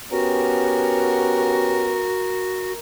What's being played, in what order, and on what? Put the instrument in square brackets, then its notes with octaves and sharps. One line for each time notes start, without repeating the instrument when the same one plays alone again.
[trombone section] B3 C#4 G4 [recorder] F#4 [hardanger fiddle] A#4